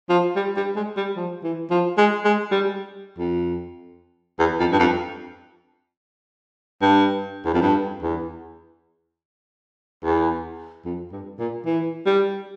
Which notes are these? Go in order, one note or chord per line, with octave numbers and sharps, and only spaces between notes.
F3
G3
G3
G#3
G3
F3
E3
F3
G#3
G#3
G3
F2
E2
F2
G2
F2
G2
E2
F2
G2
E2
E2
F2
G2
A#2
E3
G3